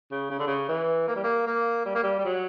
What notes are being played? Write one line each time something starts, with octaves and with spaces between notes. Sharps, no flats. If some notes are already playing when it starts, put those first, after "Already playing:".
C#3
C#3
D3
C#3
E3
A#3
G3
A#3
A#3
G3
A#3
G3
G3
F#3